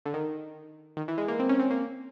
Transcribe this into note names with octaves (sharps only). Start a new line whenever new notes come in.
D3
D#3
D#3
E3
G#3
A#3
C4
C#4
C4
A#3